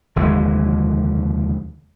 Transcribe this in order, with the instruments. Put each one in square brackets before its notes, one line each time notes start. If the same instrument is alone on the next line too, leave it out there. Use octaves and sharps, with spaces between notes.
[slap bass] F1 D#2 D3 G#3